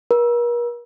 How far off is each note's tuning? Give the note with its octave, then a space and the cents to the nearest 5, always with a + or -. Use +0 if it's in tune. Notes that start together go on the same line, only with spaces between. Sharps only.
A#4 +45